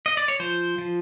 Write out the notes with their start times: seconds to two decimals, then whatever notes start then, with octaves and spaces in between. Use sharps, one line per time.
0.06 D#5
0.17 D5
0.28 C#5
0.40 F3 C5
0.78 F3